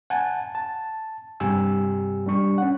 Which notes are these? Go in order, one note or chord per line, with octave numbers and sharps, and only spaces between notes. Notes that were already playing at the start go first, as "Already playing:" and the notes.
F#5 G#5 A5
A5
G2 C3 G4 G#5 E6
G3 D4 C#6
C#4 F#5